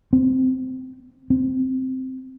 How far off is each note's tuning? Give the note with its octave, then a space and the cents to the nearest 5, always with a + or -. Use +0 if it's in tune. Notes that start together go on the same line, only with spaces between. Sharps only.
C4 -15
C4 -5